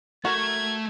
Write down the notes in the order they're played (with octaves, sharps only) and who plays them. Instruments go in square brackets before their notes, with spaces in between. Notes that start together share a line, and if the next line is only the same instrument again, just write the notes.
[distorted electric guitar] A3 [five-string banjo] F#4 A#4 [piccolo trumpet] G#6